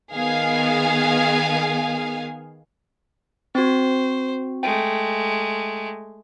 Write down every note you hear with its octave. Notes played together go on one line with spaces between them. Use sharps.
D#3 B3 G#4 F5 G#5
C4 F#4 C5
G#3 A3 G5